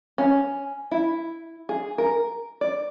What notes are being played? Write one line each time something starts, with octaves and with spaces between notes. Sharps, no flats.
C#4
E4
G#4
A#4
D5